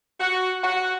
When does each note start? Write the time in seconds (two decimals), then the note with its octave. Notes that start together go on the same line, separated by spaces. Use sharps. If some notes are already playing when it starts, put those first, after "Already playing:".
0.19 F#4
0.62 F#4